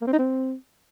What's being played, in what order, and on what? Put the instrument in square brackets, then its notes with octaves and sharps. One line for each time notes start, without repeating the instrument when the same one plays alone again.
[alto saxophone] A#3
C4
D#4
C4